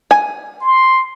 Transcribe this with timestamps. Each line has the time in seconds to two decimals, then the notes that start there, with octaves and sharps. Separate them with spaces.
0.11 G#5
0.61 C6